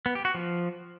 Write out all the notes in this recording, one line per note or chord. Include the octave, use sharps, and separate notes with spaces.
B3
G4
F#4
F3